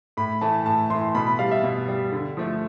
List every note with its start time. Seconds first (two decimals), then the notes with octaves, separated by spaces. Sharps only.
0.17 A2 B5
0.41 E3 A3 A5
0.65 A2 A5
0.90 E3 A3 C6
1.15 B2 B5
1.27 B5
1.39 G3 F5
1.51 E5
1.63 B2
1.88 G3
2.12 D3
2.37 F3 A3